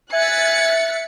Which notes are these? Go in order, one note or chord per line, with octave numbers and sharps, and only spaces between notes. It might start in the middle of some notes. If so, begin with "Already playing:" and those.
E5 G#5 F#6 A6 B6 C#7